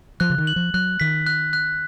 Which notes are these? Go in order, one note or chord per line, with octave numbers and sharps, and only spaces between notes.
F3 F#6
C#3
D#3
F#7
F3
F#3 F#6
D#3 B6
F#6
F#6